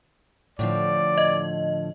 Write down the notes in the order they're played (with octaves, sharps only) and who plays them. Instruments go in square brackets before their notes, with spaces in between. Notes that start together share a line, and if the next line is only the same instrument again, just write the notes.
[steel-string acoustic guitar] A2 D3 F3 [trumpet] D5
[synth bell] D#5